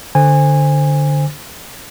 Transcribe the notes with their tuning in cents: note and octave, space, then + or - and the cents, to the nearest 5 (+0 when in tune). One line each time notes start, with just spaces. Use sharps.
D3 +0 C5 +0 G#5 -20